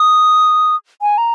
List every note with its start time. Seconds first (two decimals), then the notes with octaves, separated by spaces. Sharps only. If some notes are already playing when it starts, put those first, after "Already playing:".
Already playing: D#6
1.02 G#5
1.18 A#5